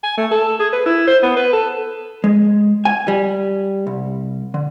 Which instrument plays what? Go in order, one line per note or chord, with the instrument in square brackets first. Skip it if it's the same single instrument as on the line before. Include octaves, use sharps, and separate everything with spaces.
[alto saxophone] G#5
A3
A4
G#4
B4
E4
C5
B3
B4
A4
[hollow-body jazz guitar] G#3
G#5
G3
C2
D3